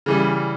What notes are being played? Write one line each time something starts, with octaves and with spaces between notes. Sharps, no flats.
C#3 E3 G3